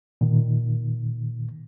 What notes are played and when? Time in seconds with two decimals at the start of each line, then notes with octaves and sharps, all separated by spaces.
0.21 A#2 D#3